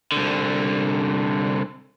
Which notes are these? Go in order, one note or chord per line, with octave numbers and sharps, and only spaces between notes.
C2 D3